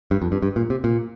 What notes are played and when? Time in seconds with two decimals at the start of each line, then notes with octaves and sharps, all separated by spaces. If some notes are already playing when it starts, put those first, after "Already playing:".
0.11 G2
0.22 F2
0.32 G2
0.42 G2
0.56 A#2
0.70 C3
0.84 A#2